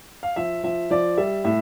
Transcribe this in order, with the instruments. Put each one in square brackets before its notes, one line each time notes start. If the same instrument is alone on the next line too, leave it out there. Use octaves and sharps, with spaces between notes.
[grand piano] F5
[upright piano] F3 [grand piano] E5
[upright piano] F3 [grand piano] E5
[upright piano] F3 [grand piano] D5
[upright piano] G3 [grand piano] E5
[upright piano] A2 [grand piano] E5